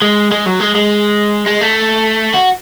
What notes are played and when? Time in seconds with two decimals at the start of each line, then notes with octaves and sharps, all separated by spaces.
0.02 G#3
0.31 G#3
0.46 F#3
0.60 G#3
0.75 G#3
1.46 G#3
1.61 A3
2.34 F#4